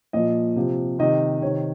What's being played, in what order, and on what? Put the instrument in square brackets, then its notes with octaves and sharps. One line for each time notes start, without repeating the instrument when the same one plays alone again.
[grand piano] A#2 F3 D#5
C3 F3
C3 D#3 D#5
C3 D#3 C#5